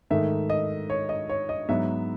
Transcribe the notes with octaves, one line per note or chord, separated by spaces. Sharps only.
G#2 D#3 A3 E5
D#5
C#5
D#5
C#5
D#5
G#2 F#3 B3 E5